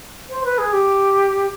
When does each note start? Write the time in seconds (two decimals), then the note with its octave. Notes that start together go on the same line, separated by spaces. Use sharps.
0.30 C5
0.44 B4
0.58 G#4
0.73 G4